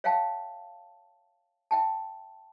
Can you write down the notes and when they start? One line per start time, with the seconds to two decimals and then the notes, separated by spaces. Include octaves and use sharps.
0.04 C#5 E5 F5 G5 A5
1.71 E5 G5 A5